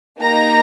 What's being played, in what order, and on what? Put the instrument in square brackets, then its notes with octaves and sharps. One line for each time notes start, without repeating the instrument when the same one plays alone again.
[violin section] A#3 D#4 G4 A#5